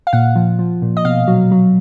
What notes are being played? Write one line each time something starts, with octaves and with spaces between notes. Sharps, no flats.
F5
A#2 F#5
F3
F3
A#2
D#5
B2 F5
F#3
F#3